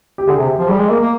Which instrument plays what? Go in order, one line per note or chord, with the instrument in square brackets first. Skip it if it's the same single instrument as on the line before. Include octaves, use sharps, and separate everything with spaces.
[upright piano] G4
[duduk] D3 [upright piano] G#4
[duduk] C3 [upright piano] G4
[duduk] F3 [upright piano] G4
[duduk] G3 [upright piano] G#4
[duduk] G#3
[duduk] A#3 [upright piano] A#4
[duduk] A#3